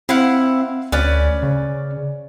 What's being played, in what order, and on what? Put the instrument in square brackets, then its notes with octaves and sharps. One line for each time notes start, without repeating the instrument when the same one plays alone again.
[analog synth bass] C4 [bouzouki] E4 F5 F#5
[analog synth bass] D2 [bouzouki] C#4 B4 D5
[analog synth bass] C#3